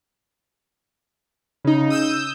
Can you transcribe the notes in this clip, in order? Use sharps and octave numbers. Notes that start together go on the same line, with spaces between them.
C#3 D#4
D#6 E6 G6